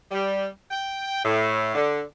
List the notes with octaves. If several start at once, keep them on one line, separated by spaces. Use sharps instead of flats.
G3
G5
A2
D3